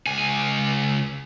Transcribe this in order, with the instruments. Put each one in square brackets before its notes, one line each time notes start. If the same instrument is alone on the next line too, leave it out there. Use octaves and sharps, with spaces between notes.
[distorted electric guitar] C#2 G#5